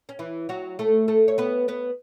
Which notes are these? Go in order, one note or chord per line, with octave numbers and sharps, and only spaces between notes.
C#4
E3 E4
F#3 F#4
A3 A4
A3 A4
C#5
B3 B4
B3 B4